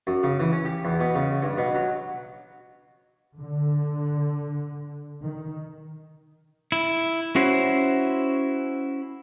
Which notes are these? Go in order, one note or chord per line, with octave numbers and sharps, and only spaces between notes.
F#2
C#3
E3
C#4
G4
E2
B2
C#3
G2
B2
F#3
D3
D#3
E4
C#4 E4 F#4 C5